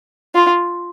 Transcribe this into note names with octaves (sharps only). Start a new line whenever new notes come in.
F4